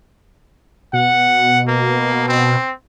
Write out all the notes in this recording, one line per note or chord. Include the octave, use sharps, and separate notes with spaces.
B2 F#5
A#3
C4